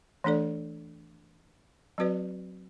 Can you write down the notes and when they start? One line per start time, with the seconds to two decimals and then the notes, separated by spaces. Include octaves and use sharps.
0.24 E3 A3 D4 A4 D5
1.98 F#3 C4 F#4 B4 D5